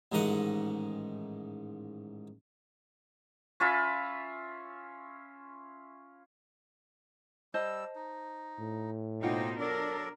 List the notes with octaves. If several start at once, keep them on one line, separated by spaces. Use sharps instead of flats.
A1 G#2 D#3 D#5 F#5
C#4 F4 E5 B5
G3 C5 D#5 A5 E6
D#4
A2
B2 A#3 D#4 F4 C5 F#5 G5
F#3 D4 A4 A#4 D5